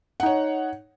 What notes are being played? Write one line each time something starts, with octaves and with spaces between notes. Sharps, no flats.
D#4 C#5 F#5